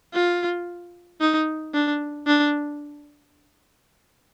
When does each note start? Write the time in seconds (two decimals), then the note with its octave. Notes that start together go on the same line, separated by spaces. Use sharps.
0.14 F4
1.21 D#4
1.74 D4
2.27 D4